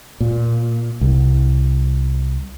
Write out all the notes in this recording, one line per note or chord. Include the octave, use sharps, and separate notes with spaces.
A#2
C2